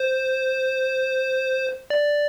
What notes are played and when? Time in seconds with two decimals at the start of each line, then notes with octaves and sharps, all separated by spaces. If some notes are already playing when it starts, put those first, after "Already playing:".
Already playing: C5
1.90 D5